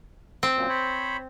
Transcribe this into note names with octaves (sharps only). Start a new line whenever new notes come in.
C4
F#2 A#2
C5 C#5 B5